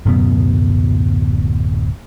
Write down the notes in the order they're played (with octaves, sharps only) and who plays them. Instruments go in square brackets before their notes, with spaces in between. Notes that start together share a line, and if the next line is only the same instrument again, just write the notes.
[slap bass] D1 F#2 B2 B3